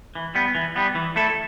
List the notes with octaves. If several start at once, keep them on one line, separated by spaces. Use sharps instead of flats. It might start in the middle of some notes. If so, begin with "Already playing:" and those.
E3
G3 B3
E3
G3 B3
E3
A3 E4 A4